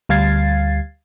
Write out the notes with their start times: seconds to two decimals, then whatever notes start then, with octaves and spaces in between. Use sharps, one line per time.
0.09 D2 G3 F5 G#6 A6 C7